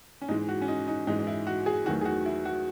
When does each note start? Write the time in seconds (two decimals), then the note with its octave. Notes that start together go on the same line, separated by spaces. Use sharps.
0.22 C#4
0.28 G#2 E3 G#3 D#4
0.48 F#4
0.61 C#4
0.68 D#4
0.88 D#4
1.07 G#2 E3 G#3 D#4
1.19 D#4
1.27 E4
1.47 F#4
1.66 G#4
1.86 E2 D#3 F#3 A3 F#4
2.01 G#4
2.05 F#4
2.25 E4
2.45 F#4